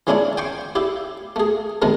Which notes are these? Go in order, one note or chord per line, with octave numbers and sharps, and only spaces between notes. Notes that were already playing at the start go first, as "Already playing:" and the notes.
E3 G#3 C#4 D4 E4 C#5
G5 G#5 C6 C#6
E4 G4 E5
A3 G#4
G#2 C3 D#3 G#3 A3